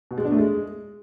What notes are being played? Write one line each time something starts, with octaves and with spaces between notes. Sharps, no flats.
B2
G#3
D4
A3
G#3